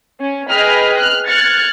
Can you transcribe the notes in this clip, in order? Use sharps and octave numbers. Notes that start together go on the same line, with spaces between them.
C#4
G#4 B4 D#5 G5 B5 F6
F6 F#6
F6 F#6 G#6 A6 C#7